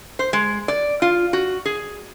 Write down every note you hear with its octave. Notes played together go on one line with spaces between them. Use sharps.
C5
G#3
D5
F4
F#4
G#4